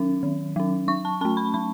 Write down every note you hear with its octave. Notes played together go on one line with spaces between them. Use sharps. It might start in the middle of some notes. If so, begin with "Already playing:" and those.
Already playing: D#3 F#3 C#4
D#3
F#3 C#4
F#3 C#6
A5
A3 C#4 A5
B5
F#3 B5